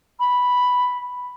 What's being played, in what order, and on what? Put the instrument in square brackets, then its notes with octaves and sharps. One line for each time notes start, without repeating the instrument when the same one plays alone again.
[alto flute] B5